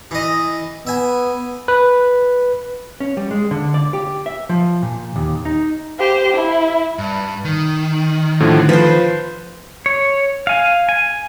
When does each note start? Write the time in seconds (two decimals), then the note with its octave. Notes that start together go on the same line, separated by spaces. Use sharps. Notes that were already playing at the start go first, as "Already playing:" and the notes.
0.11 E3 D#5
0.87 B3 E5 G#5
1.68 B4
3.00 C#4
3.17 G3
3.31 G#3
3.51 D3
3.74 D5
3.93 G4
4.26 E5
4.49 F3
4.82 A#2
5.16 D#2
5.45 D#4
5.99 G4 C5
6.34 E4
6.98 G2
7.45 D#3
8.40 A2 D3 F3
8.69 F3 B4 C5
9.86 C#5
10.47 F5 G#5
10.89 G#5